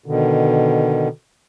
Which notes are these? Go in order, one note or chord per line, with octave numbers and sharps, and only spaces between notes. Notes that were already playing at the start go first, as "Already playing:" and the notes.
B2 D3 D#3